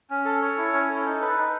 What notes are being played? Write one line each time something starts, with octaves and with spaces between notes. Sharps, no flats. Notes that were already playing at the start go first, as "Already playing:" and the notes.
C#4
A4
C#5
E4
C#4
A4
D#4
B4
D#4